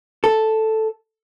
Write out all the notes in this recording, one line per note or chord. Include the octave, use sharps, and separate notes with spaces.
A4